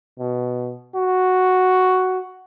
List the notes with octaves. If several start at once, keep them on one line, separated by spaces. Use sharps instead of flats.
B2
F#4